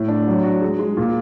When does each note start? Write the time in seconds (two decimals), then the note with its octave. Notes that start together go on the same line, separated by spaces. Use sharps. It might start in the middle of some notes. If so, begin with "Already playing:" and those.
Already playing: A2
0.08 D4
0.27 F#3
0.43 F#4
0.61 G#3
0.79 G#3
0.97 A#2